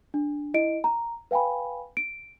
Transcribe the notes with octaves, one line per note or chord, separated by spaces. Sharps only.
D4
E4 D#5 D7
A#5
B4 F5 G5 G#5 B5
D7